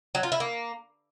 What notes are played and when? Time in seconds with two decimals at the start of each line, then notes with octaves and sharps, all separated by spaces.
0.15 F#3
0.23 F4
0.32 E4
0.40 A#3